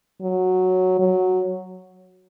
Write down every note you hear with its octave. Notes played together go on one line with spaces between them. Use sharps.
F#3
F#3